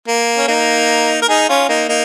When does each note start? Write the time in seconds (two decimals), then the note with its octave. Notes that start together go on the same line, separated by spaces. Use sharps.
0.08 A#3
0.38 C#4
0.48 A#3 D#4
1.22 A#4
1.29 D#4 G#4
1.49 C#4 F4
1.69 A#3 D#4
1.89 A#3 D#4